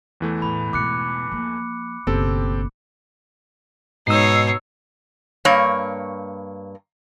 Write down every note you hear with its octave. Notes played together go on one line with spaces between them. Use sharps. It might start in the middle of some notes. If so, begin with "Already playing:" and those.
E2 E3 A3
A2 B5
G#2 B2 D6 F#6 C#7
F3 A#3
F#1 B2 C4 G4 A4
G#2 B2 D#4 C#5 E6 C7
G2 A#3 C#5